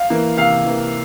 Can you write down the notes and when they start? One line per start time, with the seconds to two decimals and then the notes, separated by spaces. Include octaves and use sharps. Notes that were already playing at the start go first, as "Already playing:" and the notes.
Already playing: F5
0.10 E3 A#3
0.37 C3 F5
0.65 E3 A#3